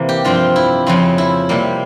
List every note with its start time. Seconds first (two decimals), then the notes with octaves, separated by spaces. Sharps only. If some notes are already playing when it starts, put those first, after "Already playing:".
Already playing: C3 E3 A#3
0.09 G4
0.25 G2 F3 C4 F4
0.56 E4
0.86 F2 C#3 F3 C4
1.18 E4
1.49 C3 G3 A#3